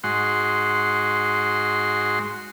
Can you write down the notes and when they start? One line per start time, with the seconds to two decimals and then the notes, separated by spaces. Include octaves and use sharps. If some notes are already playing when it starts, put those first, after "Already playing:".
0.04 G#2 F#4 C6